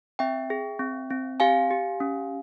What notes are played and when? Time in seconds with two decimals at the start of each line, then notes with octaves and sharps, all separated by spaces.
0.19 C4 E5 G5
0.50 G#4
0.79 C4
1.10 C4
1.40 G4 F5 G#5
1.71 G4
2.00 C#4